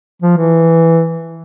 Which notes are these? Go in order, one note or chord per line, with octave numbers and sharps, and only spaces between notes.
F3
E3